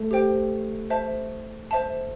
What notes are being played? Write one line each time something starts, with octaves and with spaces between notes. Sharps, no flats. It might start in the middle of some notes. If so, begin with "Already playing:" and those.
Already playing: A3
G4 C5 G5
C5 E5 A5
C5 E5 A5